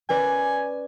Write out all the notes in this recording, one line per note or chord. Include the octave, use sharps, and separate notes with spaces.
C#4 B4 D5 G#5